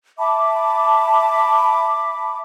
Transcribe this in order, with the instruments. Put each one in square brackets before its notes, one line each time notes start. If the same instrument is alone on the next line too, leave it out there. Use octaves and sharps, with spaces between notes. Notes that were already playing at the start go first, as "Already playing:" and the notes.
[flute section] E5 A5 B5 D6